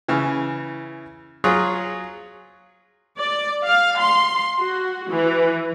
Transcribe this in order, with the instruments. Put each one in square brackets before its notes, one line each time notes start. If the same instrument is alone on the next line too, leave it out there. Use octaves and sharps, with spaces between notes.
[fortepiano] C#3 E3
F#3 F4 G#4 C#5
[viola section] D5
F5
C6
F#4
E3